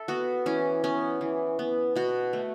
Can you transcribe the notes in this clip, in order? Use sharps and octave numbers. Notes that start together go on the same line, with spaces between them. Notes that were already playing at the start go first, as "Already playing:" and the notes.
Already playing: A4 E5
B3 F#4
E3 C#4
B3 C#4
E3
B3
B2 F#4
A3